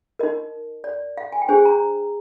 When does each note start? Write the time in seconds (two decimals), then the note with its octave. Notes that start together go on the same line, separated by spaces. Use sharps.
0.19 D#4 A#4 D#5
0.84 D5
1.17 F5
1.32 G#5
1.42 G5
1.49 D4 G#4 C5 G#5
1.65 A#5